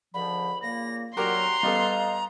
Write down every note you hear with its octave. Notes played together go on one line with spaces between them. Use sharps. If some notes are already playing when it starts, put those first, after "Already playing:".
C#2 D3 F3 B5
A#2 C#3 A#3 A#6
D3 F#3 F#4 G4 A#4 A#5 C6
G3 B3 A4 D#5 F5